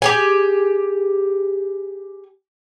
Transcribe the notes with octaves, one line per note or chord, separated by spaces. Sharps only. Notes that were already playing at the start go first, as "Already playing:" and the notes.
G4 G#4 G#5